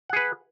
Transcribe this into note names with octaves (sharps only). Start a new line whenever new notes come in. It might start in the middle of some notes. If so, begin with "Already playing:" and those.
G#4 B4 F#5